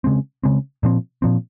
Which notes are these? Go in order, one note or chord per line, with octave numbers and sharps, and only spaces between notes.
C#3 G#3 C4
C#3 G#3 C4
A#2 F3 C4
A#2 F3 C4